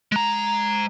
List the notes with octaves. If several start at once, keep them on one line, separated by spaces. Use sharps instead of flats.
G#3 A#5